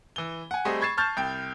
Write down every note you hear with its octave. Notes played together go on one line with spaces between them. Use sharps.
E3 G7
F#5 G#5
G3 A3 C4 G#4 D#5
B5 C#6 G#6 A6 C7 E7
A5 C#6 F6 G6 A6
C2 G5